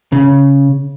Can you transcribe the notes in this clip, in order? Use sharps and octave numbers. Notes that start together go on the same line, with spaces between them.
C#3